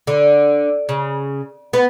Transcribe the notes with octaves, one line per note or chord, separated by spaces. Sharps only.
D3
C#3
B3